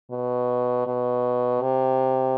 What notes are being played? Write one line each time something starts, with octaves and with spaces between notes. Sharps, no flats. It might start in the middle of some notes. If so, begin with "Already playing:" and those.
B2
B2
C3